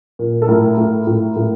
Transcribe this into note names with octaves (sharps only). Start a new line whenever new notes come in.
A#2
A4
A2 A#4
A2
A2
A2